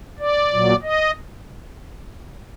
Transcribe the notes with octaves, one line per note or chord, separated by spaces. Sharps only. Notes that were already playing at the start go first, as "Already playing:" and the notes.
D5
A#2 F#3
D#5